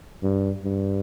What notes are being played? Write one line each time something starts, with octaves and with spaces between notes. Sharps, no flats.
G2
G2